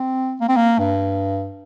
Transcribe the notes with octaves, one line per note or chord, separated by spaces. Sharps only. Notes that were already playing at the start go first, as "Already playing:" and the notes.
Already playing: C4
A#3
C4
A#3
G2